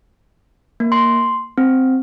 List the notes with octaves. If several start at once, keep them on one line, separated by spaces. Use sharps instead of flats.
A#3
C6
C4